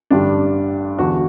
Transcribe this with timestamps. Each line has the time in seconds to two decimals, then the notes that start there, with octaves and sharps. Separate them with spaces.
0.10 A1 G2 D3 G3 D4
0.98 E1 E2 D3 F#4